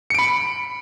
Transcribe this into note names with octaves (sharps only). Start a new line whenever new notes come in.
B5 C#7 D7